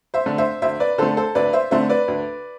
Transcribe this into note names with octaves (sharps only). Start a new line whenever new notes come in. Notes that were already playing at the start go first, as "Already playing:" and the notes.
C5 E5
D3 A3
C5 E5
D2 C5 E5
B4 D5
D3 A3 A4 C5
A4 C5
D2 B4 D5
C5 E5
D3 A3 C4 C5 E5
B4 D5
D2